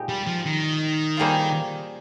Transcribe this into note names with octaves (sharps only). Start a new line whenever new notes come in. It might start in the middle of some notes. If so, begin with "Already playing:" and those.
Already playing: A#2 G#3 D#4 G4
G3
F3
D#3
G3 A#3 F4 G#4 C5